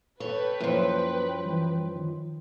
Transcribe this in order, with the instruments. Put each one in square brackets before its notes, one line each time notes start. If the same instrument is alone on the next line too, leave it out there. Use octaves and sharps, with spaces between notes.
[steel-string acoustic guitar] A4 C#5 [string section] B4 G5
[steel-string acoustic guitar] F#2 F3 [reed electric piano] F#3 A#3 E4
[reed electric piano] E3 G3
D#3